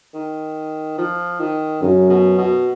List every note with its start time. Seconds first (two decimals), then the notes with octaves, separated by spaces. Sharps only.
0.14 D#3
0.98 F3
1.40 D#3
1.82 F#2 C#3
2.10 B2
2.38 B2